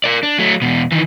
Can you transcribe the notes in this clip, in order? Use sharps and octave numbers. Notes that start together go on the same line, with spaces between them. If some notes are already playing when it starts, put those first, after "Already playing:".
A#4 D5
D4
F#3 A3
E2 B2
D#3 E3